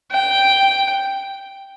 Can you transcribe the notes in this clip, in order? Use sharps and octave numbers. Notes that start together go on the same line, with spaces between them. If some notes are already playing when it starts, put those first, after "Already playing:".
G5